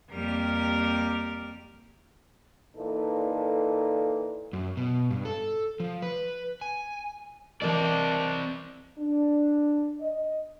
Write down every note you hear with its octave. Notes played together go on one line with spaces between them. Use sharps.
F2 G3 A#3 G4 A#4 F6
A#2 E3 D#4 A4
F#2
B2
G2
A4
F3
B4
G#5
E3 C4 D4 A#4 D5 D#5
D4
D#5